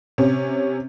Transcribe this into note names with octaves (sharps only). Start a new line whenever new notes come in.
C3 C#4